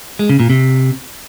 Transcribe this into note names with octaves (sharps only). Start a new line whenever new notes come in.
G#3
C#3
A#2
C3